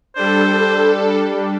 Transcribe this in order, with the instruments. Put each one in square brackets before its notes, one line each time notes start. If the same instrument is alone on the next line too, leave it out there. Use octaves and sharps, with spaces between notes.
[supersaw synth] G3 D4 [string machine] A4 [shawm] C5